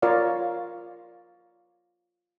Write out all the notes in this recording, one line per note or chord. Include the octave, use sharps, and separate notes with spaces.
F4 A#4 C#5 D5 F5